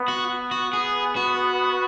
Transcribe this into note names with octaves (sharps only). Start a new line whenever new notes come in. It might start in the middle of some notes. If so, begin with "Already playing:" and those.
Already playing: B3
F#4
F#4
G#4
F#4